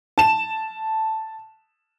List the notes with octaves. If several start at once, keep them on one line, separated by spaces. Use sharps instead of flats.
A5 E7